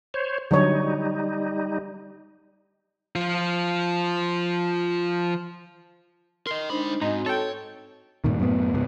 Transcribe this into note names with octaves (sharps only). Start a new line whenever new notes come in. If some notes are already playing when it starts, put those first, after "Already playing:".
C5 C#5
D3 F#3 G3 D#4 C#5
F3 F4
A#4 D#5 C6
G#3 D4 D#4 C5 B5
G#2 C4 D#4 F#4
A4 C#5 G5
G2 A#2 D#3
F#2 A2 A3 B3
C#2 G#2 B3